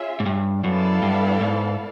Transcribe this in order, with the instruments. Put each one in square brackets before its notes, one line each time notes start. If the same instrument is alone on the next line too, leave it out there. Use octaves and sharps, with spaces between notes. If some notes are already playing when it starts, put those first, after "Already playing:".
Already playing: [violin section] C#4 F4 G#4 C#5 E5
[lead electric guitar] G#2
G2
[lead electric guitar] F#2 [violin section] B3 E4 A4 D5 F5
[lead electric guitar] G2
G#2